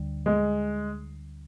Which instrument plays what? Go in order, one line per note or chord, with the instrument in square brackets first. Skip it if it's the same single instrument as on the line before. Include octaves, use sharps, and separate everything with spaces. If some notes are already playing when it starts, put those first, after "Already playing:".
Already playing: [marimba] D2 D3 G3
[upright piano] G#3